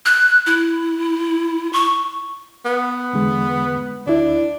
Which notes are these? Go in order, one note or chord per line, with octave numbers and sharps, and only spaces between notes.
F#6
E4
C#6
B3
E2 D3 G#3
D2 D4 E4